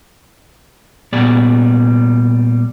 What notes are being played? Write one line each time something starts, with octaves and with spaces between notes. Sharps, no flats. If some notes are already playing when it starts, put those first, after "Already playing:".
A#2 G3 B3 G#4 D5